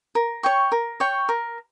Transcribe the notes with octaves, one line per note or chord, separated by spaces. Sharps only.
A#4
C#5 G5 C#6
A#4
C#5 G5 C#6
A#4